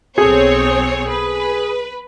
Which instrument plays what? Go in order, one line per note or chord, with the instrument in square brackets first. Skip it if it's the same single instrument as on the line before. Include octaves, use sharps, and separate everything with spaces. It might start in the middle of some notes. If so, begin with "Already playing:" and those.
[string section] B1 C4 C#5 [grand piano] G#4 A4 G#5
[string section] B4